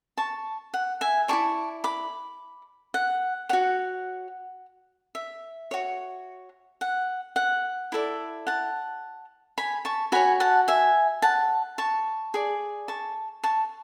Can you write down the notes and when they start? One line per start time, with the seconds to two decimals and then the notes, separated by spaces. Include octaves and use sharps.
0.18 A5 C#6
0.74 F#5
1.01 E5 G#5
1.28 E4 G#4 D5 A5 C#6
1.84 B5 D6
2.94 F#5
3.49 F#4 C#5 F#5
5.15 E5
5.71 F#4 C#5
6.81 F#5
7.36 F#5
7.92 E4 A4 D5
8.47 F#5 A5
9.58 G#5 B5
9.85 A5 C#6
10.12 F#4 C#5 G#5 B5
10.40 F#5 A5
10.68 E5 G#5
11.22 F#5 A5
11.78 A5 C#6
12.34 G#4 D5
12.88 A5 C#6
13.44 A5 C#6